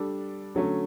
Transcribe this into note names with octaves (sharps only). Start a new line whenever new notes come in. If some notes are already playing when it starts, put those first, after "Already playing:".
Already playing: G3 D4 A4
D3 F#3 A3 C#4